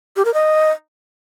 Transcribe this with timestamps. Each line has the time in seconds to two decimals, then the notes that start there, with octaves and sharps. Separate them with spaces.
0.16 G4
0.25 A#4
0.34 D#5